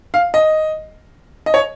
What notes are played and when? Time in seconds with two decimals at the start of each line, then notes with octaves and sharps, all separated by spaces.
0.14 F5
0.34 D#5
1.46 D#5
1.54 C#5